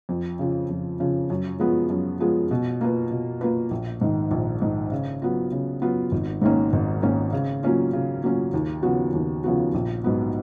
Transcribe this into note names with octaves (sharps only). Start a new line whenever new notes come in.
F2
C#3 F3
F2
C#3 F3
F#2
F3 G#3 B3 F4
F#2
F3 G#3 B3 F4
B2
A#3 F4 B4
B2
A#3 F4 B4
A#1
G#2 D#3
A#1
G#2 D#3
C#3
F#3 B3 F4
C#3
F#3 B3 F4
G#1
G#2 D#3 A#3 C#4
G#1
G#2 D#3 A#3 C#4
C#3
F#3 A#3 C#4 F4
C#3
F#3 A#3 C#4 F4
D#2
C#3 F3 B3 F#4
D#2
C#3 F3 B3 F#4
A#1
G#2 F#3 B3